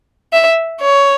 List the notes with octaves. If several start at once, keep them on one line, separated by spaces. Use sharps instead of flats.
E5
C#5